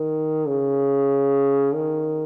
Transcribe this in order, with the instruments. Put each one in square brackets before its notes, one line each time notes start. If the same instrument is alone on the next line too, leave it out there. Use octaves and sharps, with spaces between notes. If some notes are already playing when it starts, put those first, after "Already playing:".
Already playing: [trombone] D#3
C#3
D#3